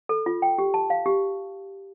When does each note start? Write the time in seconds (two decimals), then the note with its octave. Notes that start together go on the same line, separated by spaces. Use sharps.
0.09 A4
0.26 F4
0.42 G5
0.59 G4
0.74 A5
0.90 F5
1.06 G4